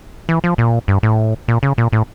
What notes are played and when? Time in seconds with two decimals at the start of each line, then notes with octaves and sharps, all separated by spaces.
0.29 E3
0.44 F3
0.58 A#2
0.88 G2
1.03 A2
1.48 A#2
1.63 C#3
1.78 A#2
1.93 A2